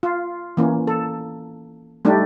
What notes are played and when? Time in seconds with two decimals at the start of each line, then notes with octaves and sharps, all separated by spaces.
0.03 F4
0.57 E3 A#3 C#4
0.87 A4
2.05 G3 A3 D4 D#4 G4